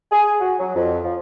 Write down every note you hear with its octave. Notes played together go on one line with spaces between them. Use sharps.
G#4
F#4
F#3
F2
F3